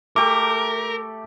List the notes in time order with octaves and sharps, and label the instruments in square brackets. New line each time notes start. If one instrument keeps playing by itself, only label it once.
[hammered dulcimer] A3 G4 [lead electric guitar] A#4 [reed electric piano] D6